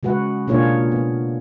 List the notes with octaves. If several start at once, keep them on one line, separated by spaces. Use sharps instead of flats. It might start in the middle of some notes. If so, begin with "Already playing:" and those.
C#3 G#3 F#4 B4 F#5
B2 A#3 D4 F4 G#4 C#5
B3